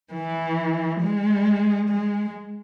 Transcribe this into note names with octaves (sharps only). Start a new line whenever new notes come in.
E3
G#3
G#3